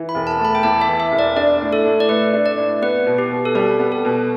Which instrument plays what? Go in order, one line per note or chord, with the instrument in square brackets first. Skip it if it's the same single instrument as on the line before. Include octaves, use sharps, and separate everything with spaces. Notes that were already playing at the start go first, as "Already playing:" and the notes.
Already playing: [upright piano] E3
[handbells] B5
[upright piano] E1
[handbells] A5
[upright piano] A3
[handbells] B5
G5
[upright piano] E2 [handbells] A5
[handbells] E5
[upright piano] E3
[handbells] E5
[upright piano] E1
[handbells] D5
[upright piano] D4 [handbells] D5
[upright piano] A2
[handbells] A4
[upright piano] A2
[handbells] D5
[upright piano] A3 [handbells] B4
[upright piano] D4
[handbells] D5
[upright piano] A2
[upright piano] B3 [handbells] B4
[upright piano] B2
[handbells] G4
[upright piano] B2
[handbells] A4
[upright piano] G3 [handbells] G4
[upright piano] B3
[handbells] A4
[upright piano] B2